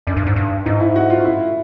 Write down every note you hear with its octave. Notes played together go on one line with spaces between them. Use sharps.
F#2 D4
G2
G#2
G2
G#2 D#4
E4
F#4
F4
E4